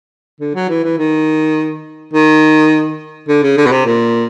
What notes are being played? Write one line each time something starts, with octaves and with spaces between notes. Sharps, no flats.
D3
F#3
E3
E3
D#3
D#3
D3
C#3
D3
B2
C3
A#2